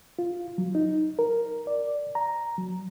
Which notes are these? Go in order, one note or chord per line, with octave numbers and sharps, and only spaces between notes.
F4
F#3
D#4
A#4
D5
A#5
F#3